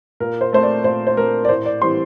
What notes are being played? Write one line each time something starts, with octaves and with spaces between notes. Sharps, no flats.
A#2 A#4
C5
A3 C4 C5
D5
A#2 C5
C5
A3 C4 A#4
D5
A2 C5
D5
E3 G3 C4 C6